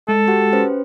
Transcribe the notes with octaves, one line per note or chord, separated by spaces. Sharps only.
G#3 A4
F#4 G4 F#5
C#4 B4 C5